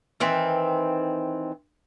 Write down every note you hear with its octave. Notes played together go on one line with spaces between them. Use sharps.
D#3 E3 C4